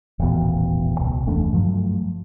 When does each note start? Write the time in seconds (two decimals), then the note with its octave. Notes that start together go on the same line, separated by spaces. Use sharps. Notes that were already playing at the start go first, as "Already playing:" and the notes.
0.19 D#1 A1 E2 B2
1.01 C#2 B2
1.26 F#1 E2 A3 D4
1.53 G2 F3 F#3 A3